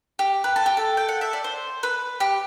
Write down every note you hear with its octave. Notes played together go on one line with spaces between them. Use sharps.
G4
B4
A4
G4
A4
G5
F#5
E5
D5
C5
B4
G4